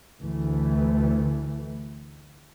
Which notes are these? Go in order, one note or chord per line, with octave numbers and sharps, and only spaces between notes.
D2 E3 A3